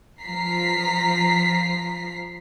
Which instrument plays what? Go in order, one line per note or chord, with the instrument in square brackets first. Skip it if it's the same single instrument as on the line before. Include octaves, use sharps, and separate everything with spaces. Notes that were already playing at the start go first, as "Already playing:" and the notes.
[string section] F3 A#5 B6 C7